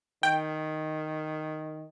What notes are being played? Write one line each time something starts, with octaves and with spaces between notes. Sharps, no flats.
D#3 G5